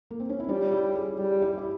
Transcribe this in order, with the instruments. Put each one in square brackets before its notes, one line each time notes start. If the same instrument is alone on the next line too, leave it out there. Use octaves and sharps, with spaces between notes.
[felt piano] A#3
C4
C#4
E4
[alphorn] G3 [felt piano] C#4 F4
[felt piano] E4 G4
F4 G#4
[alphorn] G3
[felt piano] E4 G4
E4